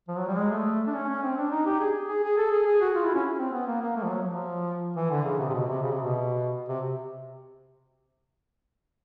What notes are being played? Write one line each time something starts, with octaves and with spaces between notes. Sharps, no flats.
F3
F#3
G3
G#3
A3
D4
C#4
C#4
C4
D4
D#4
G4
G#4
G#4
G#4
A4
G#4
G#4
F#4
F4
E4
C#4
C4
B3
A#3
A#3
A3
F3
F#3
F3
E3
D3
C#3
C3
C3
B2
C3
C#3
C3
B2
C3